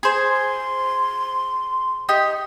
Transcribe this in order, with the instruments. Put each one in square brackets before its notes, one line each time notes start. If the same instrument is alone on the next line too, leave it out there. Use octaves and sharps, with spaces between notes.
[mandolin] G#4 C5
[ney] C6
[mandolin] D#4 G4